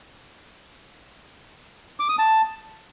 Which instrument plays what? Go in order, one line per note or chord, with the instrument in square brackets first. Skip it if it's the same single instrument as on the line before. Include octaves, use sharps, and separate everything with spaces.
[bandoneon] D6
D#6
A5